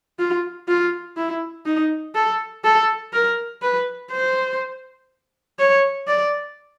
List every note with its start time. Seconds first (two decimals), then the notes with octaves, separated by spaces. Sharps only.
0.19 F4
0.68 F4
1.17 E4
1.66 D#4
2.15 A4
2.64 A4
3.13 A#4
3.62 B4
4.12 C5
5.59 C#5
6.08 D5